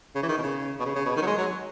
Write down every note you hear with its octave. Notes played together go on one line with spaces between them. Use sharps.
C#3
E3
D#3
B2
C#3
B2
C#3
C#3
B2
D#3
F#3
G#3
F#3